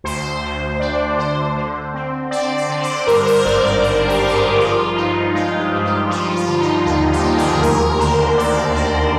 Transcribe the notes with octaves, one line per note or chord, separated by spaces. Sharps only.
D2 C5
D2
D4 D5
D3 C5
D3
C4
C4 D5
D5
D3
C5
G2 A#4
C5
G#1 D5
C5
G#1 A#4
G4
G2
A#4
G#4
F3 F4
G2 D#4
G#3 F4
G4
G2
G4
F3 F4
F4
D3
D#4
D#2 D#4
G4
D#2
G#4
D2 A#4
D3 C5
D2 D5
D2 C5